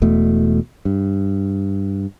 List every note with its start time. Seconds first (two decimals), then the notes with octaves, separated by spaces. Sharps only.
0.02 E1 E2 B2 A3
0.85 G2